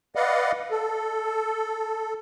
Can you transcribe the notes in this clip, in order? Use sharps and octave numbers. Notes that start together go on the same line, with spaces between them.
B4 D5 D#5 F5 F#5
A4